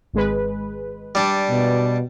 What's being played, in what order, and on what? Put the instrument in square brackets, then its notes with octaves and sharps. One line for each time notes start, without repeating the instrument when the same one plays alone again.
[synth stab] G#1 G#3 B4
[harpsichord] G3 D4
[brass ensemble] B2